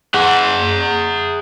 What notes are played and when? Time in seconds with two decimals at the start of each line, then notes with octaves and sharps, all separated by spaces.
0.14 G#4 F#5